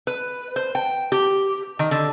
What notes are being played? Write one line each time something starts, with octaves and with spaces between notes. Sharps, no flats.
B4
C5
G5
G4
D#3
D3